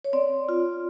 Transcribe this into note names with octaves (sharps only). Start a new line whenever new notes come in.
C#5
C4 D5
F4